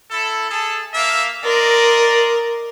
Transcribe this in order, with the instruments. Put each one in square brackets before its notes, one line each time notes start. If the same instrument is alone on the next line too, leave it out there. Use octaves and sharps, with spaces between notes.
[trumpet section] E4 A4
G#4 A4 A5
A#3 E5 F5
[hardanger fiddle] A#4 [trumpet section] D5 D#5 C6